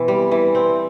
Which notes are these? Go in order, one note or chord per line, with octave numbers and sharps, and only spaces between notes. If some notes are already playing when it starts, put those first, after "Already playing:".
Already playing: B2 E3 C4
G3
E3
C4